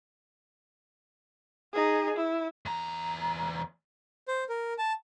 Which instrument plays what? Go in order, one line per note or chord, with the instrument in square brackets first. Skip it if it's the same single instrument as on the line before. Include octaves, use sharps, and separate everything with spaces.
[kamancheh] D#4 G#4
E4
[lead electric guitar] E2 A#5
[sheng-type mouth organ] C5
A#4
A5